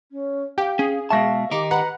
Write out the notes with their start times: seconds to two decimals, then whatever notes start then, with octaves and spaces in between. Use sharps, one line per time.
0.11 C#4
0.58 G4 F5 G5
0.79 C#4 G#4
1.10 B2 G#3 E5 F5 A5 C#6 A#6
1.51 D#3 D#4 G4 D6
1.71 B4 F#5 A#5 B5